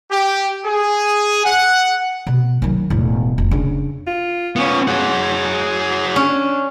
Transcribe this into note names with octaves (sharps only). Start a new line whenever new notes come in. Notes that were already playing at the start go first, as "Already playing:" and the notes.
G4
G#4
F#5
B2
D#3 F#3
E1 A2
F1
C#3 D4
F4
B3 C#4 F4
F#3 G#4 F#5
C#4 D4